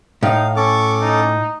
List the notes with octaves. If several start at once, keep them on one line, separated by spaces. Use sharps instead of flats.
A2 D#4 F5
C#4 A4 C#6 D6
D#4